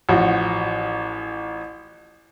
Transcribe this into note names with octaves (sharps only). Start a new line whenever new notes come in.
A1 F3 F#4